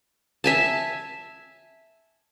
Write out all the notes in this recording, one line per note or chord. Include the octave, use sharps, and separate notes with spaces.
E5 G#5 A5